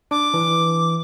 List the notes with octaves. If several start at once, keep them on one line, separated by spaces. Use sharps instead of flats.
D4 D6
E3